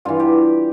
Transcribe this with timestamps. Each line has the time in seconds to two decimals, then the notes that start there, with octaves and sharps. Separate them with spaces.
0.05 G2 E3 F4
0.20 G4